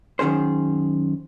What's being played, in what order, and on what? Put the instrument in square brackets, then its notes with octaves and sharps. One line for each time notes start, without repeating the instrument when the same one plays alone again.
[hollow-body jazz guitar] F#2 D#3 C#4 G#4 C5